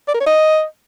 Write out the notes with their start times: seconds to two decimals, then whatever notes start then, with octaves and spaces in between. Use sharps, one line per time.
0.08 D5
0.14 A#4
0.20 C#5
0.26 D#5